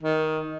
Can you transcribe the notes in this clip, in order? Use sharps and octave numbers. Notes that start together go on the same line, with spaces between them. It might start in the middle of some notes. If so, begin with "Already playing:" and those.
D#3